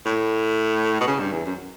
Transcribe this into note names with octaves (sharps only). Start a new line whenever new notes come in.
A2
B2
C#3
G2
E2
F#2